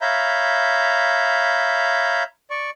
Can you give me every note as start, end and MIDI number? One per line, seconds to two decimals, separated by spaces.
0.01 2.23 73
0.01 2.23 76
0.01 2.23 77
0.01 2.23 82
0.01 2.23 83
0.01 2.23 91
2.50 2.70 74
2.50 2.70 85